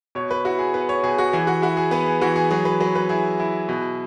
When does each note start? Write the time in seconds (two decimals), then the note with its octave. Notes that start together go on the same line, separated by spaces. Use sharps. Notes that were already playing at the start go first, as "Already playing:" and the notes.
0.15 B2 C#5
0.31 B4
0.45 E4 F#4
0.59 G#4
0.74 B3 B4
0.89 C#5
1.03 B2 G#4
1.18 F#4
1.33 E3 G#4
1.47 F#4
1.62 E4 F#4
1.77 G#4
1.91 B3 B4
2.06 G#4
2.21 E3 F#4
2.36 G#4
2.51 F#3 G#4
2.65 B4
2.80 F#3 B4
2.95 B4
3.09 E4 G#4
3.40 E4
3.69 B2